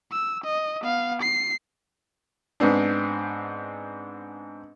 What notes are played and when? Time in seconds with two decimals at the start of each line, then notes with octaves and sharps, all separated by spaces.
0.12 E6
0.44 D#5
0.82 B3 F5
1.22 C7
2.60 G#2 B3 C4 D4